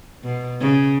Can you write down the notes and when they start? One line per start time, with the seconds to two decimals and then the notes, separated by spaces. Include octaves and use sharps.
0.24 B2
0.60 C#3